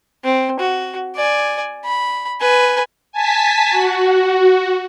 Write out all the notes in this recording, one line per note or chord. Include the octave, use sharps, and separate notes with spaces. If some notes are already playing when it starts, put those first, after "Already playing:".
C4
F#4
D5 G#5
B5
B4 G#5
G#5 A5 B6
F#4